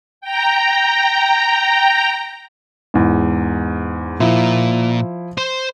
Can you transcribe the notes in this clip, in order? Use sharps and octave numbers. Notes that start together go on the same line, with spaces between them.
G5 A#5
E2 G#2
A#2 F3 E4
C5 C6